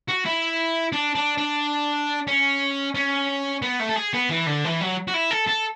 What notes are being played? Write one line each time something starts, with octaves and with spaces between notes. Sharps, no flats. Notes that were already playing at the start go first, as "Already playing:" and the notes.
F#4
E4
D4
D4
D4
C#4
C#4
B3
A3
A4
G#4
B3
E3
D3
E3
F#3
F#4
E4
A4
A4